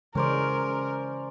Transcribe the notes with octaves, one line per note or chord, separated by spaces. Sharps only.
C#3 E3 G#3 C#4 A#4 C5 D5